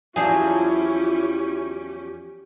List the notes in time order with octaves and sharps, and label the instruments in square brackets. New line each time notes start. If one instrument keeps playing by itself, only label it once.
[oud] E2 F3 F#3 [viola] C#4 G4 [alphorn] E4 [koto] G#4